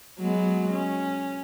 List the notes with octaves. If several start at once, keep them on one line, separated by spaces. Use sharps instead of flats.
F#3 G#3 B3
C#4